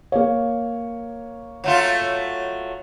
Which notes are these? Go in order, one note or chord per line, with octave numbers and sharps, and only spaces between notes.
A#3 C#5
F#3 A3 F4